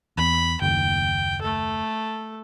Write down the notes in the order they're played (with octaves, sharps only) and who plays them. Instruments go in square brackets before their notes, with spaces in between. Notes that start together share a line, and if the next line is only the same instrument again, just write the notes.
[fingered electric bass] E2 [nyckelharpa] B5
[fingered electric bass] F#1 D#2 [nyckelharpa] G5
[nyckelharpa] A3 A4